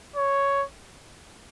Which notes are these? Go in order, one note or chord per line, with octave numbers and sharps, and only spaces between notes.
C#5